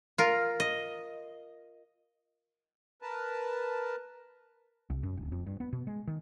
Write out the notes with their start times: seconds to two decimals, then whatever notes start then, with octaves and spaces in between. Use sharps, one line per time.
0.18 F4 A#4
0.60 D#5
3.02 A#4 B4 A5
4.90 C2
5.03 F#2
5.17 D1
5.32 F2
5.47 G2
5.60 B3
5.73 B2
5.87 G#3
6.07 D#3